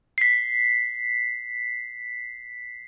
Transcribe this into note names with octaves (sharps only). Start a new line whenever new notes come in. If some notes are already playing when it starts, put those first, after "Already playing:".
B6 C7